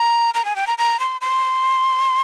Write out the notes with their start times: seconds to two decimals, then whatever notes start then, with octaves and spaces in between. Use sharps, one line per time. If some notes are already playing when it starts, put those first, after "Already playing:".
Already playing: A#5
0.34 A#5
0.45 G#5
0.56 G5
0.67 A#5
0.78 A#5
0.99 C6
1.21 C6